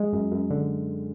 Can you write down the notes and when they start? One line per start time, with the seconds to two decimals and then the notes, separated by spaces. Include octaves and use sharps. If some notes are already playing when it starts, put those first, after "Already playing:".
Already playing: G#3
0.13 F#2
0.32 F#2
0.50 D3